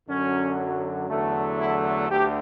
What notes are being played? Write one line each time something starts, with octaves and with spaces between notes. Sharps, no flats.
F#2 D3 F#3 C#4
E2 D3 F#3 A3
E4
D2 D3 A3 G4